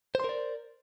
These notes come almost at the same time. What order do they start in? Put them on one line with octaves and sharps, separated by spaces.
C5 C6 A#4 D5